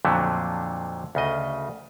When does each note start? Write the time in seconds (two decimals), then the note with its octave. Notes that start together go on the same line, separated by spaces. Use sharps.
0.05 F2 A#2 D3 F#3 A3
1.15 D2 C#3 D#5